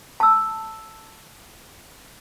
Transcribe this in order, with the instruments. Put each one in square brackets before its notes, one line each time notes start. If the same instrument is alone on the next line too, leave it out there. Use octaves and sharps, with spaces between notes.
[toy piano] A5 E6